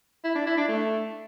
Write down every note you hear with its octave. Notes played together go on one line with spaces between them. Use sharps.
E4
D4
E4
D4
A3